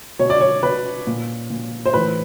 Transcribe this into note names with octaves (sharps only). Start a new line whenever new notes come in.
B2 C#5
D5
C#5
B2 B4
A#2
A#2
C5
A2 E3 B4